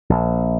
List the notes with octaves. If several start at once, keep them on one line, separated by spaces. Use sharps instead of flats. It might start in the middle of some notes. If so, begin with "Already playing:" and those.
A#1